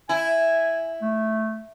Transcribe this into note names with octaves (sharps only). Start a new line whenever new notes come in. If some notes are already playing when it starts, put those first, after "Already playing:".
E4 G#5
A3